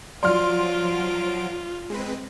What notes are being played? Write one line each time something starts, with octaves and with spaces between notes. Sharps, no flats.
F3 F#3 F4 D5 C6 F6 D7
G#3 C4 B4